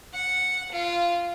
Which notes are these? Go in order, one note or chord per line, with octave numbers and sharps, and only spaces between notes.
F#5
F4